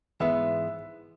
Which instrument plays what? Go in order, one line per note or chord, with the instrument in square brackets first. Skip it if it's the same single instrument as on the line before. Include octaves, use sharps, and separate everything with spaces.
[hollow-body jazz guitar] G#2 E3 G#3 B3 [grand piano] E5